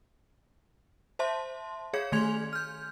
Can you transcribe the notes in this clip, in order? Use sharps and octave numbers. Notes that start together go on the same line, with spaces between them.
C5 E5 A5 C6
G#4 C#5 F5 G#6 C#7
D#3 A3 G#5 C6 G#6 F7
F6 G6